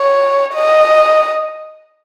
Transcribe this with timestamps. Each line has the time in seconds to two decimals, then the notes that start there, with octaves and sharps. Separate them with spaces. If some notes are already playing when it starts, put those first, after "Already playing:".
Already playing: C#5
0.54 D#5